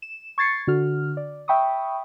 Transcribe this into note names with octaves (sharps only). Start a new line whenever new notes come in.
E7
C#6 G#6 A6 C7 C#7
D3 F#4 F6
D5
E5 G5 B5 C#6 D#6